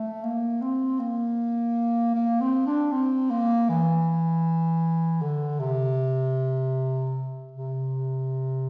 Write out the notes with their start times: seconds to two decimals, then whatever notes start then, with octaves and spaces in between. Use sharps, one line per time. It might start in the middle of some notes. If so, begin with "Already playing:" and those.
Already playing: A3
0.23 A#3
0.62 C4
1.00 A#3
2.14 A#3
2.41 C4
2.66 D4
2.92 C4
3.30 A#3
3.69 E3
5.21 D3
5.60 C3
7.51 C3